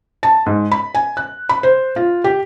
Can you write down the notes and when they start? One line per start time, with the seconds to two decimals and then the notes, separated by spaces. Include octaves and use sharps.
0.23 A5
0.46 G#2
0.72 B5
0.95 G#5
1.17 F#6
1.49 B5
1.63 C5
1.96 F4
2.24 G4